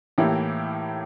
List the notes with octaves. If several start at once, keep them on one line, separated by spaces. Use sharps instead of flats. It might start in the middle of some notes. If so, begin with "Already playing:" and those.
A2 E3 A#3 E4 G4